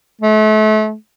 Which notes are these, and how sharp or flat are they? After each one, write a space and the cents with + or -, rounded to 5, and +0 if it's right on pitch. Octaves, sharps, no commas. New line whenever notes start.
A3 -35